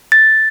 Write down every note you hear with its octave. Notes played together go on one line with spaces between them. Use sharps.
A6